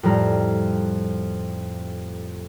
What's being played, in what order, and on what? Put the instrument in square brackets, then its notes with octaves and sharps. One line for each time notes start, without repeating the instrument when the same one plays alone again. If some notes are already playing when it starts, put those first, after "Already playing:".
[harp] F2 A2 G3 A#5 F6